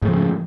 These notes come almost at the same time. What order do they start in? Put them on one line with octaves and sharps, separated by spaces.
G#2 A3 F3 C#3